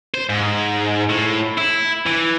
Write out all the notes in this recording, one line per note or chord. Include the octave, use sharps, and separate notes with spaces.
C5
G#2
A2
E4
E3